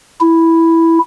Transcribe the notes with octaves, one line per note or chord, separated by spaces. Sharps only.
E4